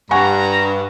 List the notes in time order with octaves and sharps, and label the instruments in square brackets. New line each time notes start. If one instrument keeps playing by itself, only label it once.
[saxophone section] G2 [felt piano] F#5 G#5 C#6 [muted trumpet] A#5